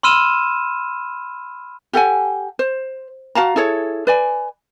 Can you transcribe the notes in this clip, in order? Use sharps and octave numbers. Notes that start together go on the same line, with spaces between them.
B5 C6 E6 F6 D#7 E7
G4 A4 F#5 G#5
C5
F#4 F5 A5 A#5
E4 G#4 A4 C#5
B4 D5 G#5